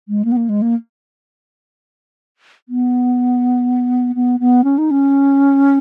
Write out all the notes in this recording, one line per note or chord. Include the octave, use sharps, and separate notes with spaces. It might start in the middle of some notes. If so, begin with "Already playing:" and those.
G#3
A#3
B3
A#3
G#3
A#3
B3
B3
B3
C#4
D#4
C#4